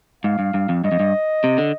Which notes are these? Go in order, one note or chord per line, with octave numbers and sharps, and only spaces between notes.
G#2 F5
G2
G2
F2
G2 D#5
F2
G2
C3
D3